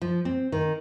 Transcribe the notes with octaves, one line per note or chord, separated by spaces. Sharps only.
F3
C4
D#3